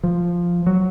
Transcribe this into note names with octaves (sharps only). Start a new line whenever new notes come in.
F3
F#3